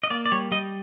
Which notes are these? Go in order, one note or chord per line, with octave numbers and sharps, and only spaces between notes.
D#5
A#3 D5
D5
G3 C#5
G3 D#5